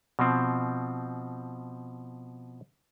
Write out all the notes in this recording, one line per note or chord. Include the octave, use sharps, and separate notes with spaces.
B2 F3 C4